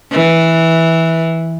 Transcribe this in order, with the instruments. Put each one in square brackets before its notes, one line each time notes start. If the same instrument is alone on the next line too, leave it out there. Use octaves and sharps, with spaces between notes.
[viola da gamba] E3